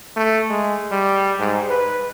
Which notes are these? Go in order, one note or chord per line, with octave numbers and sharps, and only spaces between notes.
A3
G#3
G3
G#2
B4